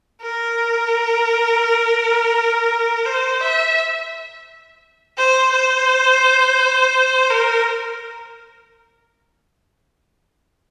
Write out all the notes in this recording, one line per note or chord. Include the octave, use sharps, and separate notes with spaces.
A#4
C5
E5
C5
C5
A#4